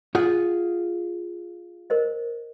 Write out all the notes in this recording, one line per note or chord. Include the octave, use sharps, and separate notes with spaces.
F4 G#4 F#5
A#4 C5 D#5